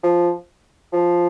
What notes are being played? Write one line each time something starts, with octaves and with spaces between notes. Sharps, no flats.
F3
F3